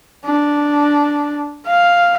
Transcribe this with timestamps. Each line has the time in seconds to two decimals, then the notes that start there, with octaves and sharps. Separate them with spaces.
0.25 D4
1.67 F5